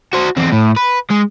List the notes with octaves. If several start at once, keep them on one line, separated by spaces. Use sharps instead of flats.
F#4 C5
E2 C4
A2
B4
G#3